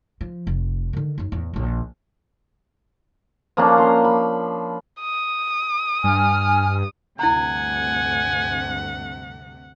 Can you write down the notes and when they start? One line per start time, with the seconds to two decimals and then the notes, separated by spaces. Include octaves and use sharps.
0.21 F3
0.47 F1
0.93 D3 D#3
1.18 F#2 D#4
1.32 E2 A2
1.53 A#1 D#2
3.57 F3 A#3 C#4 D4
3.77 A#5 C6
4.04 B5
5.01 D#6
6.04 G2 G#5 F6
7.19 D2 G2 C3 E4 F#5 G#5 A#5